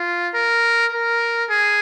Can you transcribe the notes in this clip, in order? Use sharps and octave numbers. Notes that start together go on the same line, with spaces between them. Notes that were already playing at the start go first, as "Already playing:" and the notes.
Already playing: F4
A#4
A#4
G#4